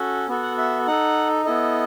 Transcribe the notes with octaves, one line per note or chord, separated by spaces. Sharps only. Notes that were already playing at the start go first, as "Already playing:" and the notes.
Already playing: C#4 F#4 A4
B3 F#4 A4
F#5
E5
D#4 A4 F#5
B3 E4 A4 D#5